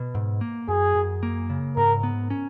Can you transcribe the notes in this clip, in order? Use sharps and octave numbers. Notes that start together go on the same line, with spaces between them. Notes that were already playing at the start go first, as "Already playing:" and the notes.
Already playing: B2
G#2
A#3
F#2 G#4
F#2
A#3
C#3
G#2 A#4
B3
C#4